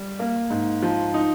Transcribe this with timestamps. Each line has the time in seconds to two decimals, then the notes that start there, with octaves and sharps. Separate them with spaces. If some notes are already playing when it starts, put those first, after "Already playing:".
Already playing: G3
0.19 A#3
0.50 G#2
0.83 F3
1.14 D#4